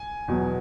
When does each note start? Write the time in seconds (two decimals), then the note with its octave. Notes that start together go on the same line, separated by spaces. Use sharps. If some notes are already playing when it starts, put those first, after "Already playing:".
Already playing: G#5
0.28 E2 B2 F#3